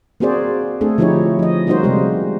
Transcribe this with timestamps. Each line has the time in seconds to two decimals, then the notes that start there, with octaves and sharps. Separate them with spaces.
0.20 A#3 C4 F#4 G#4 C5 D5
0.81 A3 C4 D4 G#4 A4
0.98 D3 F3 D#4 E4 G4 C#5
1.39 F3 D#5
1.67 G3 A#3 C#4 D#4 F#4 C5
1.83 C3 G#3 G4